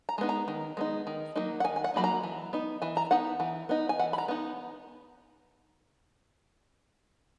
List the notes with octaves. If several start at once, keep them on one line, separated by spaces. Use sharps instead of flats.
A#5
G#3 B3 D#4
A#5
D#3
G#3 B3 D#4
D#3
F#3 A#3 D#4
F#5
D#3 G#5
G#5
F#5
F#3 A#3 D#4 B5
A#5
E3
B3 D#4
E3 G#5
A#5
B3 D#4 F#5
E3
B3 D#4
G#5
E3 F#5
B5
A#5
B3 D#4